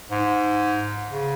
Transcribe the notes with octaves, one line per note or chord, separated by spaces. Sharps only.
G#2
C#3